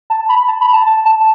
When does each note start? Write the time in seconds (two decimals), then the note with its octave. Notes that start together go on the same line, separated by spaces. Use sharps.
0.10 A5
0.29 B5
0.48 A5
0.61 B5
0.73 A5
0.86 A5
1.05 A5